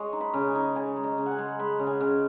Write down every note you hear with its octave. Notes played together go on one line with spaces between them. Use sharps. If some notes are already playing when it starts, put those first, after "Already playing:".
Already playing: G#3 C#5 D#5
D#4
B5
C#3
G#5
D#4
C#3 G#5
G#3
D#5
C#3
F#5
G#5
G#3
G#3 B5
C#3
G#5
C#3